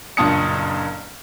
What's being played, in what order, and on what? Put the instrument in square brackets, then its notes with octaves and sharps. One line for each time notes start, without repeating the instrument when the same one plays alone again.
[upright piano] F#1 G2 A#2 A5 D#6 C#7